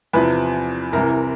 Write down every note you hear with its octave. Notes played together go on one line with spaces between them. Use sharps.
E2 C3 F3 B4 B5
C2 C3 E3 A#4 A#5